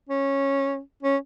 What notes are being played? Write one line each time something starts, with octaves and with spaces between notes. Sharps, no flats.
C#4
C#4